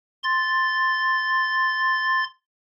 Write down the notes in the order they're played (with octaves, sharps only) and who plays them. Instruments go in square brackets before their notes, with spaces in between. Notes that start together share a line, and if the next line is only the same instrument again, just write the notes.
[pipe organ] C6 A6